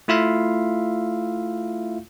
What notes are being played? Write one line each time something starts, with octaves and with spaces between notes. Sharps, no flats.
A3 E4 F4 E5 F5